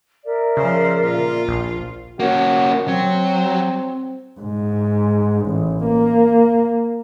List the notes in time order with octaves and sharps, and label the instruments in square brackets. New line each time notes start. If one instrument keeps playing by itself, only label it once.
[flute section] A#4 D5 E5
[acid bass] C#3 [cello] F3 C5
[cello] A#2 F4
[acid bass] A#1
[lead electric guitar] A#3 C#4 [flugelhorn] F#4
[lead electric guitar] F#3 [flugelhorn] C4
[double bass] G#2
A1
A#3